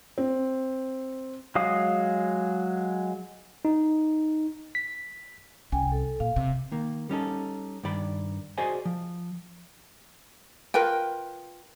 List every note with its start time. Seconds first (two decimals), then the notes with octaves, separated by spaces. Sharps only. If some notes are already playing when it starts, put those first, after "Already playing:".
0.18 C4
1.55 F#3 G#3 F5 D#6
3.65 D#4
4.75 B6
5.72 C2 C#4 G5 G#5
5.92 A4
6.20 A#2 F5
6.36 C3
6.72 D#3 A#3
7.09 G3 C#4 D#4 A4
7.84 G2 D#3 D5 B5
8.58 F#4 G#4 C5 D5 D#5 G#5
8.85 F3
10.74 F4 A#4 B4 G5